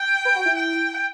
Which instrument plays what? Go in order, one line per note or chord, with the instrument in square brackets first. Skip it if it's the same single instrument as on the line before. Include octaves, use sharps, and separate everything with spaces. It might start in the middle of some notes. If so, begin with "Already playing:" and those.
Already playing: [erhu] G5
[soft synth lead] B4
F#4
E4
[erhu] G5